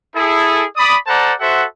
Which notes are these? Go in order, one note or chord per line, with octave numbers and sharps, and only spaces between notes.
E4 G#4 A4
D5 B5 D#6
A4 C5 D5 F#5 A5 A#5
F#4 A4 C5 E5 F#5